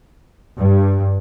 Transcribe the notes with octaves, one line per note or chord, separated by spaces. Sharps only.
G2